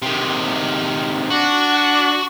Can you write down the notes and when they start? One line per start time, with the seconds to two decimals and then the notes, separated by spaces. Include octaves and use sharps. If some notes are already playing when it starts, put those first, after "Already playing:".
0.02 C3 D#3
1.31 D4 F#4